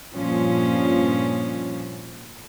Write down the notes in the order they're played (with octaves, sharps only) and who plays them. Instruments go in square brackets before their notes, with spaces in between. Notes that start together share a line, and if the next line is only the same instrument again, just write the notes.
[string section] G2 A#2 F3 C#4